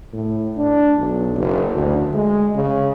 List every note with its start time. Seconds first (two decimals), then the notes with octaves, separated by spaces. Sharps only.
0.13 A2
0.57 D4
0.98 B1
1.36 F#1
1.75 D2
2.13 G#3
2.55 C#3